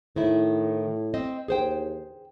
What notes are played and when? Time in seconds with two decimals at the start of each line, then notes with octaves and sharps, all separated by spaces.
0.16 A2 D#3 E4
1.14 C4 D#5
1.48 D#2 G#4 C5 G5